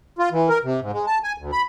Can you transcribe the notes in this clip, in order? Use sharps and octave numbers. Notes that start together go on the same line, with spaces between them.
F4
E3
A#4
C3
G#2
G#3
A5
G#5
D2
B5